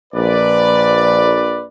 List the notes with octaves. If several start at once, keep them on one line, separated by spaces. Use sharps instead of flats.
A#1 B4 D5